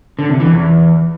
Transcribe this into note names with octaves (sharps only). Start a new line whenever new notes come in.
D3
C3
E3
E2